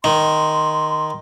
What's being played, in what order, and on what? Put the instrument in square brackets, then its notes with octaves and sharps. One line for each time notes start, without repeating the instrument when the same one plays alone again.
[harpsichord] D#3 [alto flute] C6